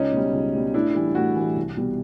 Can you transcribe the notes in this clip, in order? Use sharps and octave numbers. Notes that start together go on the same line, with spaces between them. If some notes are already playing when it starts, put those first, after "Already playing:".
Already playing: C#2 C#4 D#4
B2 G3
C#2
B2 G3
A2 D4 E4
E3 G3
A2 E4 F#4
E3 G3
C2
B2 G3